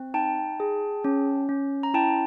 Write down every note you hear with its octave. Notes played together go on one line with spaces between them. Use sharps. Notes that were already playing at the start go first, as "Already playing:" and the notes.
Already playing: C4
D#4 G5 A5
G#4
C#4
C#4
A#5
E4 G5 A5